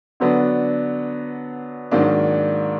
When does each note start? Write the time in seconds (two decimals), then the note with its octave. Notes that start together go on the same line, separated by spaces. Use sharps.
0.20 D3 F#3 B3 D4
1.91 G#2 D#3 F#3 A#3 D4